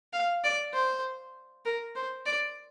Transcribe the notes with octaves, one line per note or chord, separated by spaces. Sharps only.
F5
D5
C5
A#4
C5
D5